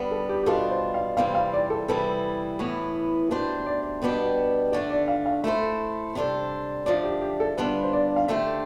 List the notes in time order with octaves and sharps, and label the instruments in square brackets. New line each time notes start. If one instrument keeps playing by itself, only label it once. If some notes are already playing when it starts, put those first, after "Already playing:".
Already playing: [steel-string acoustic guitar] D3 G3 B3
[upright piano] A4
G4
G4
[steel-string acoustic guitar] B2 G3 D4 F4 [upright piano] A4
[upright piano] C5
F5
[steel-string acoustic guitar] C3 E3 G3 C4 [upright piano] F5
[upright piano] F5
D5
A4
[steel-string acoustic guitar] C3 E3 G3 B3 E4 [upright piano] A4
[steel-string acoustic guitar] A2 E3 B3
[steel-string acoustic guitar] B2 A3 D4 G4 C5 [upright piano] B4
[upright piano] D5
[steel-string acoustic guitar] B2 G3 B3 D4 G4
[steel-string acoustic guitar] D3 A3 D4 [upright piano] D5
[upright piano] D5
F5
F5
[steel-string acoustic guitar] A3 E4 A4 C5 [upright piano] E5
[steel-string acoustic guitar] C3 G3 D4 A4 C5
[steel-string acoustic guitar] D3 F3 A3 D4 [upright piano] D5
[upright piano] G4
G4
A4
[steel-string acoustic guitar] D3 G3 B3 D4 F4 [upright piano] B4
[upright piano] C5
D5
F5
[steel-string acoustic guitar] D3 A3 D4 G4 C5 [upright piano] E5